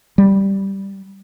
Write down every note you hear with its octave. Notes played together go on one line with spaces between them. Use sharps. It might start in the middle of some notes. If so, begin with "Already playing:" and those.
G3